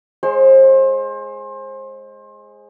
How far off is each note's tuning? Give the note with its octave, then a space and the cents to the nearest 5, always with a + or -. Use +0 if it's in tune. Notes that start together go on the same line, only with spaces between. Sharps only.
G#3 +0 C5 +30 C6 +0